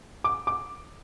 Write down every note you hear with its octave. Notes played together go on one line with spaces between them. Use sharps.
D6
D6